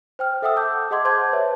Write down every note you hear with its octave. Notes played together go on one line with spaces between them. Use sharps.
C5 G5 F6
A4 E5 F#5 G5 D#6 E6
A5 D6 G6
G#4 D#5 F#5 C6 D6 G#6
C5 A5 C6 D6 G6 G#6
B4 C#5 E5 A5